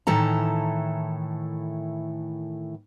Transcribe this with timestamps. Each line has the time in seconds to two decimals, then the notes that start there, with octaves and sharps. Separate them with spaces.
0.07 A2 D#3 E3 A4 A#5